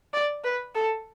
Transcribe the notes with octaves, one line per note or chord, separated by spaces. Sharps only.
D5
B4
A4